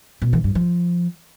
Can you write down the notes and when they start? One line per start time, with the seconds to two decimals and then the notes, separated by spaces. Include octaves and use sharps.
0.22 B2
0.33 E3
0.44 G2
0.55 F3